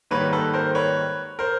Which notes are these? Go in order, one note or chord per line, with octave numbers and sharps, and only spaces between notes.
G#2 D#3 G3 A#3 B4 C#5
A4 B4
A#4 C5
B4 C#5
A#4 C5